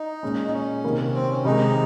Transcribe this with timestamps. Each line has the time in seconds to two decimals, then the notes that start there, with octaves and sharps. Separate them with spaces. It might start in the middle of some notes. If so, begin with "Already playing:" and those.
Already playing: D#4
0.23 A#2 G#3 C#4
0.48 D#4
0.53 C#4
0.84 C3 D#3 A#3
1.14 C4
1.30 C#4
1.45 C3 D#3 G#3 D#4